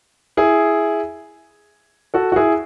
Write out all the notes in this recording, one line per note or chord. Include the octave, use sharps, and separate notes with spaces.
E4 G#4
F#4 A4
F#4
E4 G#4